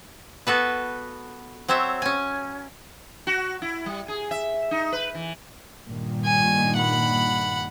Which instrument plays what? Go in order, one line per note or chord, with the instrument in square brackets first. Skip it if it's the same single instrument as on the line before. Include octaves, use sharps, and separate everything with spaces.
[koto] B3 F#4 A4 B4
F#3 C4 C5 C#5 E5
C#4 G#5
[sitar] F#4
E4
G3
G#4
E5
D#4
B4
E3
[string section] G2 A#2 D#3
[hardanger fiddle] G#5
F#5 B5